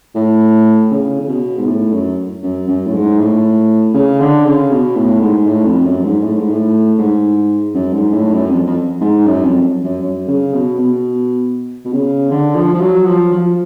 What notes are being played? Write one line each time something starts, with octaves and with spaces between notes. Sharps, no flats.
A2
C#3
C#3
B2
G#2
A2
F#2
F#2
F#2
A2
G#2
A2
C#3
D3
C#3
B2
A2
G#2
A2
F2
F#2
G#2
A2
G#2
A2
G#2
F#2
G#2
A2
F#2
F2
F2
G#2
F#2
F2
F#2
F#2
C#3
B2
B2
B2
C#3
D3
F3
F3
F#3
F3
F3